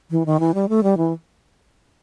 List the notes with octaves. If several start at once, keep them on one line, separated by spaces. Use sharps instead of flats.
E3
D#3
E3
G3
A3
G3
E3